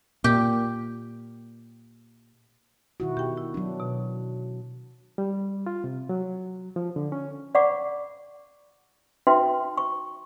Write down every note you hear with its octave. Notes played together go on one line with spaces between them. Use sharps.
A#2 G4
B2 D#3 E4 F#4
B2 G4 G5
E4
F#3 D4
B2
G3
F4
C3
F#3
F3
D3
C#4
D5 F5 F#5 B5 C#6 D6
D#4 F#4 B4 E5 G5 C6
C#6